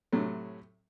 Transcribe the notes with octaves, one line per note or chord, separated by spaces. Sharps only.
A2 C3 F#3 A3